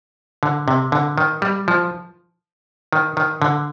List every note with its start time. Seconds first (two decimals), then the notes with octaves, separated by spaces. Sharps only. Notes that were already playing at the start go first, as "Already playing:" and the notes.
0.43 D3
0.68 C3
0.92 D3
1.18 D#3
1.42 G3
1.68 F3
2.93 D#3
3.17 D#3
3.42 D3